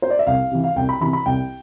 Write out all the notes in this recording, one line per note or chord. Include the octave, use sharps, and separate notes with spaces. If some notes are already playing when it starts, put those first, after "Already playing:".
C5
D5
E5
C2 F5
C3 E3
F5
C2 G5
B5
C3 E3 B5
B5
C2 G5